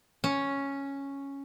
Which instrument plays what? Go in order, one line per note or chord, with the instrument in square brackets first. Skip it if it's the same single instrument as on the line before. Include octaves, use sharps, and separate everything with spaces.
[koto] C#4